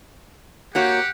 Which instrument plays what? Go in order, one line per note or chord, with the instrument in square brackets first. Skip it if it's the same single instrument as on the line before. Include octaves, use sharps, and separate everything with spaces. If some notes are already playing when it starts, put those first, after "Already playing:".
[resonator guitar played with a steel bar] A#3 F#4 C#5 [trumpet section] G4 F#5